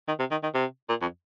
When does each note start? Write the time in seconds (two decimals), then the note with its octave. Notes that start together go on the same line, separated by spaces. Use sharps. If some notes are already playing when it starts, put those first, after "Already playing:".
0.08 D#3
0.19 C3
0.31 D#3
0.43 D#3
0.55 C3
0.89 A#2
1.01 F2